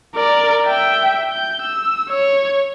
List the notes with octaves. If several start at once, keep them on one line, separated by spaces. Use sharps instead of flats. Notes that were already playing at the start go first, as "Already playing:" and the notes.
A#4 D5
E5 G5
G6
E6
C#5